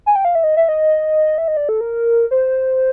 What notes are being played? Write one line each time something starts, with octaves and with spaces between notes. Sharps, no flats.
G#5
G5
F5
E5
D#5
E5
D#5
E5
D#5
D5
A4
A#4
C5